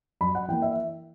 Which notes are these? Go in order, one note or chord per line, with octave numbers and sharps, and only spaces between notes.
F#2 B5
F#5
E3 A#3 G5
E5